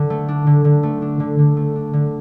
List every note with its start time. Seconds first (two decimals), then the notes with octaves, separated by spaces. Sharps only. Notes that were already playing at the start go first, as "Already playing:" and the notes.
Already playing: D3
0.10 A3
0.28 D4
0.47 D3
0.64 D3
0.83 A3
1.02 D4
1.20 D3
1.38 D3
1.57 A3
1.75 D4
1.93 D3